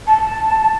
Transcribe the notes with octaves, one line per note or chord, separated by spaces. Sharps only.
A5